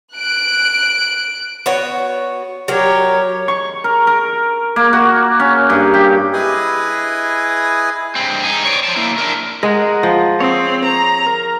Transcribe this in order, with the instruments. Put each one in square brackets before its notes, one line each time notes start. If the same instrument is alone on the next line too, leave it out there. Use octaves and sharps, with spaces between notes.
[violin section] F#6 D7
[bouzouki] B3 F#4 C#5
[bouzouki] F#3 A#4 [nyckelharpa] G4 C#5
[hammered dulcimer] C#6
A#4
A#4
A#3
F#4
C#4
G2
G4
[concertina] E4 G#4 B4 D#5 G#5 D#6
[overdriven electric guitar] G2 C4
D#4 G#4
C#5 D5
C5 A5
A#3 E4
D4 A#4
[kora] G#3 [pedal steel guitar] A#4 D#5 F#5
[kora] F3
[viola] C4 [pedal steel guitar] C#5 D#6
[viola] A#5
[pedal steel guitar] A#4